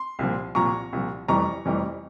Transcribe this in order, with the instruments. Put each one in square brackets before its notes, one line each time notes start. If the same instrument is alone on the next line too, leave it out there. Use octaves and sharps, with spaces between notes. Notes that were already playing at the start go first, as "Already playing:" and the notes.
Already playing: [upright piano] C6
C2 A#2 F3
C2 A#2 F3 A#5 C#6
C2 A#2 F3
F1 F2 E3 G3 A#5 C#6
F1 F2 E3 G3